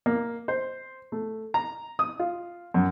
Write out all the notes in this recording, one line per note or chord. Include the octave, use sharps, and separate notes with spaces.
A#3
C5
A3
A#5
D#6
F4
F#2